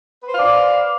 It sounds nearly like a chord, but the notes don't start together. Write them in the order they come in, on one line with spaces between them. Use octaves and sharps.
B4 C5 F5 D5